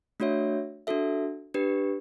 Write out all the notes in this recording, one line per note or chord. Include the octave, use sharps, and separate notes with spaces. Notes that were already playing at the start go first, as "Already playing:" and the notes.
A3 D4 F#4 C#5 E5
D4 F#4 A4 E5
D4 G4 B4